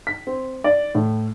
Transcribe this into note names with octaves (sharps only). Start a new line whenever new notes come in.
B6
C4
D5
A2